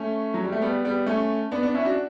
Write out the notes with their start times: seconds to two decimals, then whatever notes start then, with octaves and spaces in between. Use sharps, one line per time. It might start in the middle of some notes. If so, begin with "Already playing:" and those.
Already playing: A3 C#4
0.34 F#3
0.44 G3
0.52 A3
0.62 G3 B3
0.84 G3 B3
1.07 A3 C#4
1.52 B3 D4
1.63 B3 D4
1.74 C#4 E4
1.85 D4 F#4